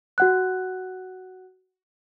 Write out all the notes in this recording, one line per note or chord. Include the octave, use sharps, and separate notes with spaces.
F#4 F#5 F#6